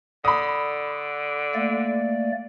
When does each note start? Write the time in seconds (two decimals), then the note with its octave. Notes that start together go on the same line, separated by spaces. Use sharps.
0.25 D3 B5 D#6
1.55 A3 A#3 D5